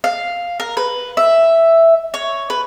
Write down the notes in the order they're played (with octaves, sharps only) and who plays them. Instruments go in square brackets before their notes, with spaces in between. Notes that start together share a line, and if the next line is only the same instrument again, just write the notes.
[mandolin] F5
A#4
B4
E5
C#5
B4